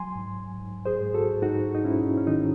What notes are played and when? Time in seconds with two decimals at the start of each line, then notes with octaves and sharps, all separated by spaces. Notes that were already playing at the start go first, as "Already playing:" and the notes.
Already playing: F#3 G#5 C6
0.15 G#2
0.58 G#2
0.85 G#4 C5
1.00 G#2
1.14 F#4 A4
1.42 G#2 D#4 F#4
1.75 D#4
1.84 G#2 C#4 E4
2.17 C#4
2.27 D#3 D#4